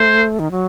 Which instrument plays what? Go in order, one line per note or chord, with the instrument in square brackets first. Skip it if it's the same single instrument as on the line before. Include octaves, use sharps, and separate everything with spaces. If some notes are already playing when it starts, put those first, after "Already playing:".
Already playing: [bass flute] A3 [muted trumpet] C5
[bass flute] D#3
F#3